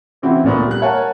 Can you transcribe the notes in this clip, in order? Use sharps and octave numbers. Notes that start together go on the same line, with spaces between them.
C#3 E3 C4 E4 F#4
D2 A#2 B3
G3 F#6
A#4 C#5 F#5 G#5 A5